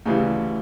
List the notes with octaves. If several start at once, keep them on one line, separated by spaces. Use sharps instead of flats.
D2 C#3 E3 G3